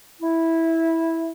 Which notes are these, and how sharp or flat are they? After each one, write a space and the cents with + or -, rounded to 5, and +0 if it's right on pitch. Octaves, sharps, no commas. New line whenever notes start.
E4 -10